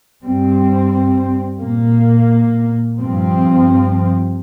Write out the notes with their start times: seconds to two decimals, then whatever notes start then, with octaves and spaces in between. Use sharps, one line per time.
0.22 G2 G3 C4
1.60 A#2 A#3
2.98 G2 F3 C4